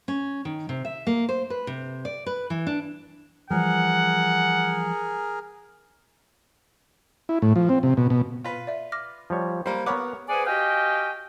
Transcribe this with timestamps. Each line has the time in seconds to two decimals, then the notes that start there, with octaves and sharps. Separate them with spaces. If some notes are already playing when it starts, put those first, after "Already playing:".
0.08 C#4
0.45 D#3
0.69 C3
0.85 E5
1.07 A#3
1.29 C5
1.50 B4
1.67 C3
2.05 D5
2.26 B4
2.50 E3
2.67 D4
3.50 E3 F3 G3 G#4 A#4 F#5
7.29 E4
7.42 A2
7.56 F3
7.69 C4
7.83 C3
7.97 B2
8.10 B2
8.44 F4 B4
8.67 D5 E5
8.92 D6 F6 A#6
9.30 F3 G3 C#5
9.66 G3 A#3 C5
9.86 B3 A#4 B4 C#5 F#5 D6
10.29 G#4 B4 C5 D5 F#5 G#5
10.46 F#4 G4 D#5 F5 G5 G#5